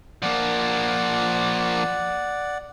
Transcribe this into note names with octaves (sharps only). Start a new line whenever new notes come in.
F3 A#3 D5 F#5